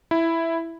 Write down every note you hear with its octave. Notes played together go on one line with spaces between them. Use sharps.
E4